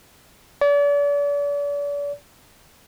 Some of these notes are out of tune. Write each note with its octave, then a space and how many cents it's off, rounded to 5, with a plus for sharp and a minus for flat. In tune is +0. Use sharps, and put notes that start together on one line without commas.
D5 -40